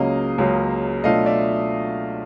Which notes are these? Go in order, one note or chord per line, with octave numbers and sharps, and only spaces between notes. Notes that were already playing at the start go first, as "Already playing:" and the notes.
Already playing: C#2 C#3 F#3 A#3 D#5 F5
C#2 C#3 F#3 A#3
B2 F#3 A3 D4 F4 D#5 F5
D5 E5